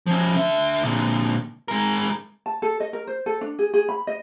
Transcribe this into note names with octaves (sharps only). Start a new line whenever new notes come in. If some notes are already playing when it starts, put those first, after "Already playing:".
F3 C#4
D3 E5
A#2 D3
G#3 A#4
A5
A4
D#5
A#4
C5
A4
D4
G#4
G#4
B5
D#5